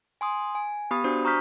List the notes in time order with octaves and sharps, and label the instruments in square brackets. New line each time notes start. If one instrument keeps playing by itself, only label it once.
[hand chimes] G#5 C6 D#6
G#5
B3 G4 B5 D#6
D4 F#4 C5
A#5 C#6 D#6 F6 G6 B6